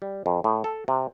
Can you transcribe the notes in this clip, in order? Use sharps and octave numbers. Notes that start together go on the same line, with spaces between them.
G3
F2
A2
A4
C3